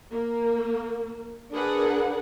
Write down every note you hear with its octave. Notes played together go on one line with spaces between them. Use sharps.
A#3
D4 G#4 A#4 B4 F#5